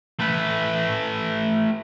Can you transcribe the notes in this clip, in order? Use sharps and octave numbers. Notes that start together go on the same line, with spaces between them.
A3 B4